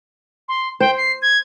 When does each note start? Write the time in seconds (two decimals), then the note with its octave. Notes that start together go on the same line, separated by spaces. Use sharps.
0.48 C6
0.80 C5 G5
0.97 C7
1.22 G#6